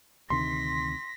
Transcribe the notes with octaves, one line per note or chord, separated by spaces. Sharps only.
D2 C3 D#3 C6 A#6 B6